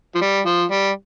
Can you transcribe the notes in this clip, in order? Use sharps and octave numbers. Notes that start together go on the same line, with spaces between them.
F3
G3
F3
G3